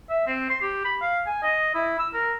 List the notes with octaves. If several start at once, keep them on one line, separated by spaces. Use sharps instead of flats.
E5
C4
C6
G4
B5
F5
G#5
D#5
E4
E6
A#4